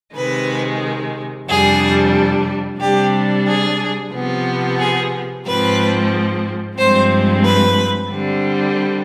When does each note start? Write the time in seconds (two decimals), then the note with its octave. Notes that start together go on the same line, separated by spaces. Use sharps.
0.15 C3 D#3 G#3 B4
1.48 F2 C3 G3 D4 G#4
2.80 C3 G3 D4 G4
3.46 G#4
4.12 C3 F3 B3
4.78 G#4
5.45 G#2 F3 C4 B4
6.77 G2 F3 G#3 C4 C5
7.43 B4
8.10 D3 G3 C4